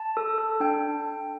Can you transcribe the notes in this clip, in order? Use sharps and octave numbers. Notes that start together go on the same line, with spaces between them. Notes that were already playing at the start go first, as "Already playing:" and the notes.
Already playing: A5
A4
A4
D4 G5